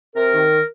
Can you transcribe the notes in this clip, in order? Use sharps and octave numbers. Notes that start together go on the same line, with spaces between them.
C3 A#4
D#3